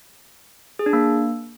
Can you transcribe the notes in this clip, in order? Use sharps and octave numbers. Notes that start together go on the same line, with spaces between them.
G#4
D4
A#3